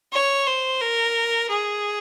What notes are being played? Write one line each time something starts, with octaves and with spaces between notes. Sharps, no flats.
C#5
C5
A#4
G#4